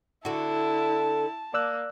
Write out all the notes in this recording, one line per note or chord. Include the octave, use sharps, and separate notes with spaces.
D3 E4 F#4 A5
A#3 D5 E6 F#6